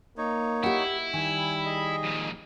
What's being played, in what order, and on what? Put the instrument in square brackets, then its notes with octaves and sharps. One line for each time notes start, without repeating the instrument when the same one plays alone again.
[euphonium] A#3 [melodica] D#4 C#5
[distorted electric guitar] E4 [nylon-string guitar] G4 F#5
[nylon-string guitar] D#3 [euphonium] G3 [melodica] G#5
[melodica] G#4 D#5
[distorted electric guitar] F2 A#2